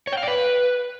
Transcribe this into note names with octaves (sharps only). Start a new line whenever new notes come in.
C#5
G5
F5
D5
B4